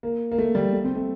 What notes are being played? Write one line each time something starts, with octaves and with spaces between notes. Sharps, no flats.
A#3
A#3
A3
G3
A3
C4
A3